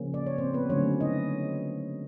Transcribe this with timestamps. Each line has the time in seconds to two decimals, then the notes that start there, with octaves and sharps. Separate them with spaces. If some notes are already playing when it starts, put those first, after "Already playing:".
Already playing: C#3 F3 A#3 C#4
0.14 D5
0.26 C#5
0.38 C4 C5
0.54 B3 B4
0.69 D3 F#3 A3 C#4 C#5
1.01 D#4 D#5